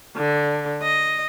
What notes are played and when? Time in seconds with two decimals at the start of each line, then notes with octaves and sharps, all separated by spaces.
0.17 D3
0.82 D#5